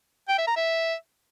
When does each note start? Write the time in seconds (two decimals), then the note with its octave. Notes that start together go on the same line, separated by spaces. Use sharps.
0.28 G5
0.38 E5
0.47 A#5
0.56 E5